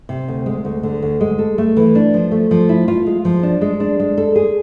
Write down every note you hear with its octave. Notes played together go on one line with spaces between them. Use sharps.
C3
D2
G#3
D2
D3
D2
G#3
A4
A3
E3
D4
F3
A3
F3
E4
F4
G#3
F3
D4
G#3
D4
G#3
A4
G#4